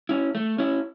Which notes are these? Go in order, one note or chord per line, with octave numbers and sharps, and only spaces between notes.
C#4 E4
A3
C#4 E4